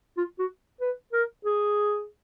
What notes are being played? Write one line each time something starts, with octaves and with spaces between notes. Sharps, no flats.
F4
F#4
B4
A#4
G#4